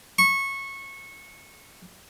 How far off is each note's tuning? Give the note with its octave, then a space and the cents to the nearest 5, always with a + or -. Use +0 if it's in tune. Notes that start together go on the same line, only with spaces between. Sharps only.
C#6 -20